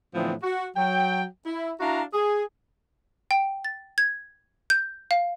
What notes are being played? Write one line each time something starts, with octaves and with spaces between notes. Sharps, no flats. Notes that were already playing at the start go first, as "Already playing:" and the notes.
A2 D3 E3 F3 B3 C4
F#4
F#3 G5
E4
D4 E4 F#4 F5 A#5
G#4
G5
A6
G#6
G6
F5